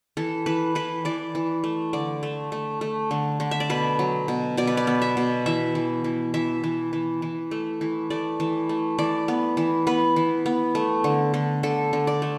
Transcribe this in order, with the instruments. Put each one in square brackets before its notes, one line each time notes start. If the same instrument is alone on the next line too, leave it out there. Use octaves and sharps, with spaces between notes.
[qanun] E3 A4
E3 B4
E3 B4
E3 D5
E3
A3
D3 D5
A3
A3
A3
D3
D3
E5
D5
B2 B4
F#3
B2
B2 D5
B4
D5
B3
E5
B2
E3 E5
E3
E3
E3 E5
E3
E3
E3
A3
E3
A3 D5
E3
A3
E3 D5
B3
E3
B3 B4
E3
B3
A3
D3
D3
D3 A4
D3
D5
A3